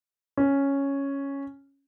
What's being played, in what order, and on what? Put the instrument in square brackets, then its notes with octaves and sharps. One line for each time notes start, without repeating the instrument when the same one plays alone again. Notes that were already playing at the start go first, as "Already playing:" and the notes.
[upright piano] C#4